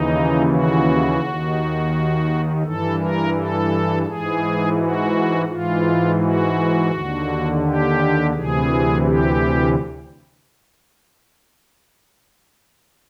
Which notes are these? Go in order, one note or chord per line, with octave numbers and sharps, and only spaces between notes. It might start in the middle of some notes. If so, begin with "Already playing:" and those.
Already playing: D#2 C#3 E3 D#4
F#4
D#2 D#3
G2 E3 A4
A#4
A4
G#2 E3 G#4
F#4
G#2 E3 F4
F#4
D#2 D3
G4
D2 C3 E3 G#4
G4